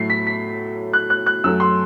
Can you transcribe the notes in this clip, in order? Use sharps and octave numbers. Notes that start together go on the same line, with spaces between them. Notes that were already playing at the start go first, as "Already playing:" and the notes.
Already playing: A2 F#3 A3 C7
B6
B6
F#6
F#6
F#6
F#2 F#3 A3 E6
C6